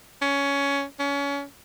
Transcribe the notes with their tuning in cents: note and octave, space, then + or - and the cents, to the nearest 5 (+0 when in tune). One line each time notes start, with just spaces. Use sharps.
C#4 +15
C#4 +25